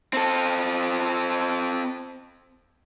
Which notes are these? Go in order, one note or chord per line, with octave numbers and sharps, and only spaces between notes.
C4 A4